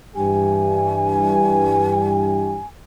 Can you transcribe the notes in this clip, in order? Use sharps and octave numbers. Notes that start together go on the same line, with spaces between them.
G2 E3 G4 G#5